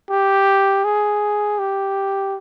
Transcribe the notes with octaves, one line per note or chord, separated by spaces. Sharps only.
G4
G#4
G4